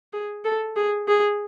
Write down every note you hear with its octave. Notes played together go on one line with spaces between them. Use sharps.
G#4
A4
G#4
G#4